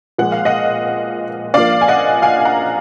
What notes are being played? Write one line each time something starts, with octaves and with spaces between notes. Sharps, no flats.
A#2 F3 G#3 F#5
F5
D#5 F#5
F3 A#3 D4 D5 F5
G#5
D#5 F#5
F5 G#5
G#5
F#5 A#5